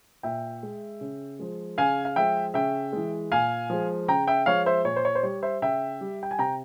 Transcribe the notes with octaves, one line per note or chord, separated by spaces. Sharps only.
A#2 E5 G5
G#3
C#3
F3 G#3
C#3 F5 G#5
F5
F3 G#3 E5 G5
C#3 E5 G5
E3 G#3
A#2 F5 G#5
F3 G#3
C#3 G5 A#5
E5 G5
F3 G#3 C#5 F5
C5 E5
A#2 C#5
C5
C#5
C5
G3 C#5
C5 E5
C#3 E5 G5
G3
G5
G#5
C3 G5 A#5